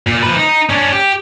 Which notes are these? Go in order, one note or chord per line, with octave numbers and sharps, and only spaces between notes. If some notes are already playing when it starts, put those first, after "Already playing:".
A#2
F3 B4
D#4
C#4 D4
G4